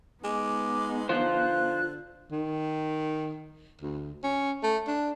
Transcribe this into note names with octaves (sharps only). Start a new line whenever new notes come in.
G#3 B3 D#4 D6
D3 F4 C5 F#6
D#3
D2
C#4
A3
D4